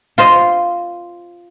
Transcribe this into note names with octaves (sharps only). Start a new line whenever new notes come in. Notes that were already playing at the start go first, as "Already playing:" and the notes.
F4 C5 D#5